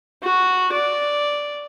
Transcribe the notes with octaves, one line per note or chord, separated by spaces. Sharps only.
F#4
D5